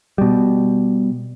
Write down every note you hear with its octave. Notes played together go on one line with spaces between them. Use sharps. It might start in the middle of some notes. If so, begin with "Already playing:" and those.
B2 G3